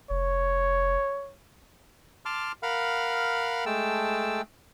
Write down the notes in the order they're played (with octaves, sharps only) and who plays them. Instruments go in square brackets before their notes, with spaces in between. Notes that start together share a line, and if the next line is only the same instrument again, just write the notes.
[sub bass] F1 [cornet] C#5
[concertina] A5 C6 D6 F6
A#4 F5 F#5 B5 F6
G#3 A3 G5 A5 E6